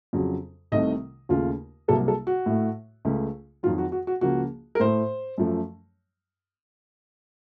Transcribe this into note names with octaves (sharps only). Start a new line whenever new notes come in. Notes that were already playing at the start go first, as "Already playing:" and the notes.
F2 C#3 F#3
C2 C3 D#3 A3 D#5
D#2 C#3 A3 F4
C2 C3 F#3 A#3 A4
A4
F#4
A2 A3
C#2 C#3 A3
F2 D#3 F#3 F4
F#4
F#4
F#4
C#2 C#3 F3 A#3 F#4
A#4
A2 A3 C5
F#2 F3 A3